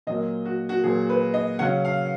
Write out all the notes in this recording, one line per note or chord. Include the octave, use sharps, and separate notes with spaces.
A#2 F#3 A#3 D#5
F#4
F#4
A#2 F#3 A#3 G#4
B4
D#5
C#3 F#3 C#4 F#5
F5